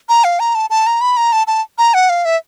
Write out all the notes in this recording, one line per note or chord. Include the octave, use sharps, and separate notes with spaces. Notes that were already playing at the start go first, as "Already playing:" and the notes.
A#5
F5
A#5
A5
A5
A#5
B5
A#5
A5
A5
A#5
F#5
F5
E5